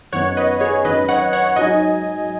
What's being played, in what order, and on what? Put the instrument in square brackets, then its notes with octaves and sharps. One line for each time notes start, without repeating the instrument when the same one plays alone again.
[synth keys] F#2 D#3 B3 D#4 C#5 F#5
B4 D#5
G#4 C#5
G#1 F#2 D#3 B4 D#5
C#5 F#5
C#5 F#5
G#2 F#3 D#4 D#5 G#5